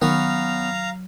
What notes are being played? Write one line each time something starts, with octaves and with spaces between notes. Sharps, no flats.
D#3 F#3 B3 C#4 F5 A#5